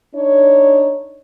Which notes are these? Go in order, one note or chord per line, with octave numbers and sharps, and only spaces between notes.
D4 D#4 C#5